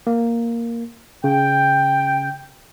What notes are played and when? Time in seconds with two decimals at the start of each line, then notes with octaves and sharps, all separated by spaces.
0.07 A#3
1.24 C#3 G5